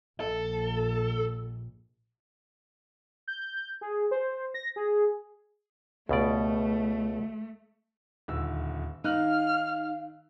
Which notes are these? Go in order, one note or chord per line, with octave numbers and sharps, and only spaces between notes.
A#1 A4
G6
G#4
C5
A#6
G#4
C#2 B2 A3 D5
D#1 D2 E6
D#3 D#4 F5 F6 F#6 F#7